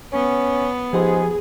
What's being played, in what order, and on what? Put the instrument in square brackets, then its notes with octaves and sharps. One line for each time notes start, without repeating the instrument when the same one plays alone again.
[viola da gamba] B3 [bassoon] C#4
[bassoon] G#2 [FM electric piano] F3 G4 C6 [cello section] G#4